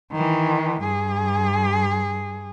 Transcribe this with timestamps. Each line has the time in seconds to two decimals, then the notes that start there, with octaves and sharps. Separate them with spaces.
0.12 D#3 E3
0.82 G2 G#4